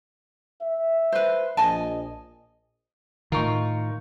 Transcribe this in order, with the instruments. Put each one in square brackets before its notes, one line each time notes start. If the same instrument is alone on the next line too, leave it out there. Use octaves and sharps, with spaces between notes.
[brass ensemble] E5
[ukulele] B4 C5
[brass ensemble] A#1 [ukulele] D#5 G#5 A5
[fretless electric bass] A2 D#3 [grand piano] D#4 C#6 [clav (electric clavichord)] F4 A#4